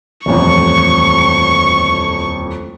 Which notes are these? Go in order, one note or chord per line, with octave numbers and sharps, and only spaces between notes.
D#1 A1 F2 C#6